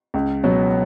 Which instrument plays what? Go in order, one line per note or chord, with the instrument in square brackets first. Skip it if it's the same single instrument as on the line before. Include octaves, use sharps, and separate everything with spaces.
[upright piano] C#2
B2 F#3 B3